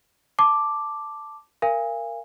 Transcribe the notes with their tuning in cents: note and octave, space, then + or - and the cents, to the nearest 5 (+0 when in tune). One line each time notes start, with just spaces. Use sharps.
A5 +0 D6 +0
A#4 +0 F5 -35 G#5 -25